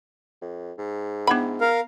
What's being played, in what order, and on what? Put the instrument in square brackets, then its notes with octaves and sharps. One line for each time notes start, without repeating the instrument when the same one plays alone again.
[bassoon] F2
G#2
[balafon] B3 F#5 [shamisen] D4 E4 B5
[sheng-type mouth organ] A#4 F5